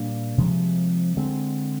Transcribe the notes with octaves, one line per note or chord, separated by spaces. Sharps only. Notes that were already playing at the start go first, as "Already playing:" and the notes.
Already playing: A#2 G3 A#3 D4
C3 F3 G#3
D3 G#3 C4